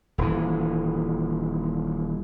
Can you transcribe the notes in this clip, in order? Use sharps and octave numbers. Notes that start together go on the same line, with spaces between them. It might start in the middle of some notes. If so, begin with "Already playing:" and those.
D#1 E3